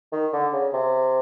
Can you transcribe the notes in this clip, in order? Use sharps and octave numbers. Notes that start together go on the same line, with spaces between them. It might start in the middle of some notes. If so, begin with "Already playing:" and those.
D#3
D3
C#3
C3